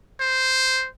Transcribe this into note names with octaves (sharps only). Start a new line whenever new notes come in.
C5